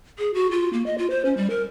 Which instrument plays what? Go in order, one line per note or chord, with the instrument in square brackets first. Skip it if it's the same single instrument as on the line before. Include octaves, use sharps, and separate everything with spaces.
[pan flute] G#4
F#4
F4
A#3
D#5
F4
C5
C#4
G3
A#4